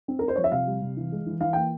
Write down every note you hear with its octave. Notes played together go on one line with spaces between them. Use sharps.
C4
A#4
C4
C5
F3 C#5
E5
C3 F5
G3
C3
E3
G#3
E3
E3 F5
A#3 G5